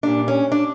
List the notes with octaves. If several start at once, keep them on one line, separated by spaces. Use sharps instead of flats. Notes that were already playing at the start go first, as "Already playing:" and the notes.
A#2 G3 D4
C#4
D4